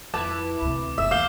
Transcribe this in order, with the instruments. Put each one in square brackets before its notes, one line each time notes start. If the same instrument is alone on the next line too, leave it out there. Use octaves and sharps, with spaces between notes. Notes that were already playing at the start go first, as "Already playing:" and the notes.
[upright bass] F2 [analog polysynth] E4 B4 [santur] A5 [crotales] D6
[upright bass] D2 C3
[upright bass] F#1 [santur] E5 [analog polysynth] E7
[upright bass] E2 E3 [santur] F5 [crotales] D6 G6 G7